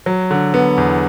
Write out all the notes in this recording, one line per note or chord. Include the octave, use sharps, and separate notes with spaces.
F#3
D3
B3
E2